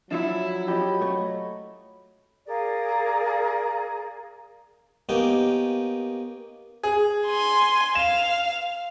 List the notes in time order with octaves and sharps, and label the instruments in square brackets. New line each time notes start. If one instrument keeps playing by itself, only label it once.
[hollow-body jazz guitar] F3 D4 [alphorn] F#3 [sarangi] E4
[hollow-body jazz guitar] C#4 F4 G4 [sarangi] D#5 [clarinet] B5
[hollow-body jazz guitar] A3 C#5
[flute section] G#4 A#4 D5 F5
[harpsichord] A#3 B3 C#4 D#4 G4
[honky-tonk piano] G#4
[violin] G#5 C6
[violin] F5 [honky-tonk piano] E7